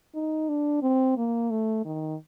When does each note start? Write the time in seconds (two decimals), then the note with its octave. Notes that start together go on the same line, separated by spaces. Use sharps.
0.15 D#4
0.49 D4
0.82 C4
1.17 A#3
1.51 A3
1.85 D#3